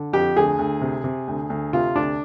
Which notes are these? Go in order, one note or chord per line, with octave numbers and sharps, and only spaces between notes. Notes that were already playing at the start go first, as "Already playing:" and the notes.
Already playing: D3
F2 G4
D2 G#4
D2
C3
C3
D2
D2
C3 F4
D2 D4